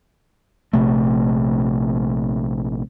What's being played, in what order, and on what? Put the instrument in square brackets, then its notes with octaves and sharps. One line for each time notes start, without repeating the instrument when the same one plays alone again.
[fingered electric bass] A#1 C3 A3